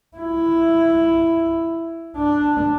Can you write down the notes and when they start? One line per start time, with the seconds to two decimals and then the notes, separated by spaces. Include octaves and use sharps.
0.17 E4
2.17 D4